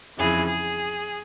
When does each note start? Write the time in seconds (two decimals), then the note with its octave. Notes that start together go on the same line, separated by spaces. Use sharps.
0.18 F2 C#3 E3 G#4
0.47 G#4